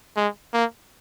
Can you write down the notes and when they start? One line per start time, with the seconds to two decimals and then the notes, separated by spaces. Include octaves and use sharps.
0.16 G#3
0.53 A#3